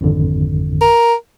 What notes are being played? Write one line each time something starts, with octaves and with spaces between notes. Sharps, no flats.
G#1 F2 D3
A#4